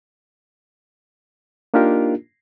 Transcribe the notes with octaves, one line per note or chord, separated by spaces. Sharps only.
A#3 D4 D#4 F4 G4 A#4